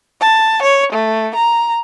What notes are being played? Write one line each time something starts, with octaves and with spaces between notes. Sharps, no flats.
A5
C#5
A3
A#5